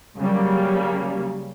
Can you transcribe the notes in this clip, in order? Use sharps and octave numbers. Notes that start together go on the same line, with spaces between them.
C#3 F#3 G3 A#3